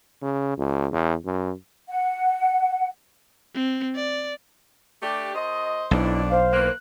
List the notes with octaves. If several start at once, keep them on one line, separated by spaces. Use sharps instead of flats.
C#3
C#2
E2
F#2
F#5
C4
D5
A3 D4 G4
F#2 C5 D#5
B1 F2 D4 E4
C5 F5
D#3 E3 A#3 F#6